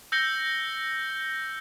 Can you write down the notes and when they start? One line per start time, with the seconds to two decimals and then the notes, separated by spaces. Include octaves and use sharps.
0.12 E6 G6 A#6 C#7 G7